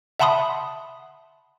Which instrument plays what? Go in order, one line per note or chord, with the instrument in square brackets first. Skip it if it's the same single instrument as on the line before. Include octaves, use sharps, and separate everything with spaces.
[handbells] E5 F#5 A5 B5 C6 D#6